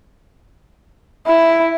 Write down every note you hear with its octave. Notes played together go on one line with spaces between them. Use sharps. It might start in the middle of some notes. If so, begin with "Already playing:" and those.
E4